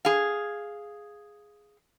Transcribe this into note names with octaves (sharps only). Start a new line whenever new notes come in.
G#4 F5